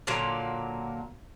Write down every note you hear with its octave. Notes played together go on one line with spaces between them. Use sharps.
A#2 D3 F#3 A#3